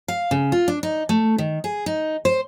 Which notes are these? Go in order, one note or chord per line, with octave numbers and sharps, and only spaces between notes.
F5
C#3
F4
D4
D#4
A3
D#3
G#4
D#4
C5